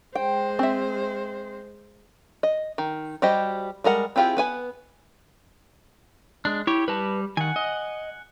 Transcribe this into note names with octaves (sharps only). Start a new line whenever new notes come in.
G#3 C5 G5
C4 E5
D#5
D#3
G3 F#4 G4 C5 D#5
G3 G#3 A#4 F#5
C4 E4 F4 G4 G#4
B3 B4 G#5
G#3 D4
E4 G4 C#5
G3 B4 A5
D#3 F#5 G#5
D#5